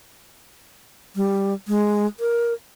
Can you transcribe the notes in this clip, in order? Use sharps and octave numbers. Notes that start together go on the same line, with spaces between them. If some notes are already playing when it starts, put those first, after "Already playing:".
G3
G#3
A#4